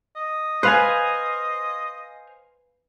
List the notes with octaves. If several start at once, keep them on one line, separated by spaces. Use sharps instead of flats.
D#5
B4 C5 F5 G#5